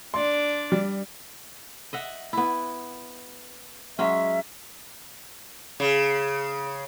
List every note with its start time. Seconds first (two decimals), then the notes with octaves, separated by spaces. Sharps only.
0.14 D4 D5 C6
0.72 G3
1.93 D#5 E5 F#5
2.33 B3 E4
3.99 F#3 G#3 C#4 E5
5.80 C#3